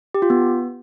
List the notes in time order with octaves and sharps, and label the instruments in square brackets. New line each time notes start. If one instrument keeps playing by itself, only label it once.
[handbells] G4
F4
B3